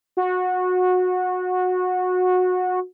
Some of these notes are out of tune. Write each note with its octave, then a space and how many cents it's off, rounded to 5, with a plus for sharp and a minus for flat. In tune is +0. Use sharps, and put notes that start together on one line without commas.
F#4 -20